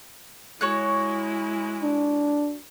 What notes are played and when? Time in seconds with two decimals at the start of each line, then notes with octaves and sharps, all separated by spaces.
0.61 G#3 E4 F#4 C#5 F#6
1.82 D4